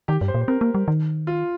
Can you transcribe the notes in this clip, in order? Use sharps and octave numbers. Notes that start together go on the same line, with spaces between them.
D#3 G4
G2
C5
A#2
C5
C4 A#4
A#3
G3
D#3
F4